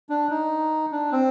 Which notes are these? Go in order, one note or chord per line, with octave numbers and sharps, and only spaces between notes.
D4
D#4
D4
C4